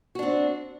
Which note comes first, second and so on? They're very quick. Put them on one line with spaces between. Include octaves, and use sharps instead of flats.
F#4 D4 C4